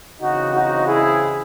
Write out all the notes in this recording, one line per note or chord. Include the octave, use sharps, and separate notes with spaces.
C#3 E3 C4 D#4 F#4
D#4 F#4
E4 G#4